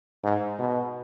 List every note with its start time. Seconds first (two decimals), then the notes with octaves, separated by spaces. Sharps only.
0.24 G#2
0.59 B2